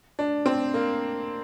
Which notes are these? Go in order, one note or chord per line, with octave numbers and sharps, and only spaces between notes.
D4
C4
A#3